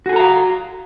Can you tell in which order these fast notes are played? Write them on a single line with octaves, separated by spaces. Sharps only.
F#4 G#4 A4 A#5 F5